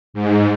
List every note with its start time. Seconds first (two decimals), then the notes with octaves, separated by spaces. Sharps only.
0.14 G#2